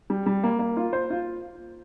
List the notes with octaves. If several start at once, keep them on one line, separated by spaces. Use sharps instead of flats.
G3
G3
A#3
A#3
F4
C5
F4